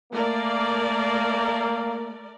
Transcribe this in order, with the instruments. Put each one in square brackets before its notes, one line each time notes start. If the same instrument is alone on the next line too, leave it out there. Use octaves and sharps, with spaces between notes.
[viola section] A3 A#4 D5 [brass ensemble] A#3